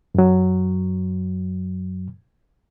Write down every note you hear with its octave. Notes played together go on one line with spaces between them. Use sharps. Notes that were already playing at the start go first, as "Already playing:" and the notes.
F#2 F#3